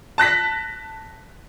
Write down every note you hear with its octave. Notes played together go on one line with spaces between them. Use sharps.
A5 F#6 A#6 B6